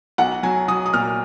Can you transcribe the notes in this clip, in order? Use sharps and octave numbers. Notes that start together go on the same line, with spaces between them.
B1 F#5
F#3 G#5
F#3 D#6
D#6
A#2 F6